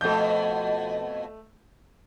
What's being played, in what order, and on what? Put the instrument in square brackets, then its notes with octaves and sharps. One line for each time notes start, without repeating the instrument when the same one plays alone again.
[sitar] F2 B2 [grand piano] A3 G6